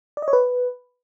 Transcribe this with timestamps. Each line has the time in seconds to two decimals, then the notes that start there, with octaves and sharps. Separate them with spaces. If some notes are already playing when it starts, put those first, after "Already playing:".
0.17 D5
0.22 D#5
0.28 C#5
0.33 B4